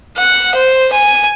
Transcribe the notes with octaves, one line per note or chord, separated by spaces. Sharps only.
F#5
C5
G#5